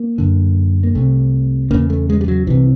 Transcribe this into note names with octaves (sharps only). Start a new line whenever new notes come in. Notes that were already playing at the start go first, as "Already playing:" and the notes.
Already playing: A#3
F#2 D3
A#3
C2 C3 A3
E2 C#3 A#3
A3
G#3
G3
F#3
C2 C3 E3